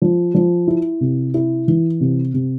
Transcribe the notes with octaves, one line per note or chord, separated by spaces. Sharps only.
F3
F3
E4
C3
E4
E3
C3
C3